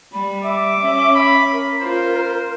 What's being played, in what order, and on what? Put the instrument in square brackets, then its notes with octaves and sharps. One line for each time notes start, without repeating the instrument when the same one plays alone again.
[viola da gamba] G3 [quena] B5
[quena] E5 [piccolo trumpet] D6
[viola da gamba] C#4
[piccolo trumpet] B5
[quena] A#4
[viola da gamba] F4 [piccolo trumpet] C5